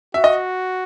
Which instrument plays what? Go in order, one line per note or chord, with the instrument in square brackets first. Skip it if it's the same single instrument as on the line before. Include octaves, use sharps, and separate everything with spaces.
[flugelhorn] F#4 [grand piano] E5
[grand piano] D#5